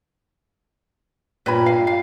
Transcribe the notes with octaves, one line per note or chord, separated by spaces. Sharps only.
G2 A#2 B4 C#5 B5
F5
F5